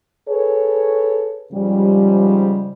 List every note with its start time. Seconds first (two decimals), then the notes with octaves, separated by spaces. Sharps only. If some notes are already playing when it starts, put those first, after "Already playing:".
0.29 G#4 A4 B4 C#5
1.52 G#2 C#3 F3 G3